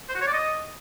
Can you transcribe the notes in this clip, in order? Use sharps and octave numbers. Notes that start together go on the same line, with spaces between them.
C5
F#4
C#5
D5
D#5